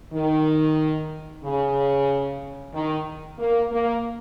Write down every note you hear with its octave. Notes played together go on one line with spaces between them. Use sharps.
D#3
C#3
D#3
A#3
A#3